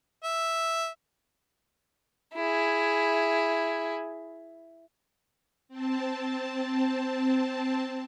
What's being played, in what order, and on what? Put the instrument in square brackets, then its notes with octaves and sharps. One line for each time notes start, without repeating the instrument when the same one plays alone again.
[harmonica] E5
[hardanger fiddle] E4 G#4
[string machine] C4 A5